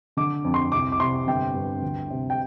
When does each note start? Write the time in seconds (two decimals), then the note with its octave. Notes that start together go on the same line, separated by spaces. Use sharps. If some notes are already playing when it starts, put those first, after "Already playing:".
0.17 D3 D6
0.45 F2
0.54 C6
0.72 C2 D6
0.92 D6
1.00 C3 C6
1.27 G1 G5
1.54 G2
1.82 D2
2.10 C3
2.30 G5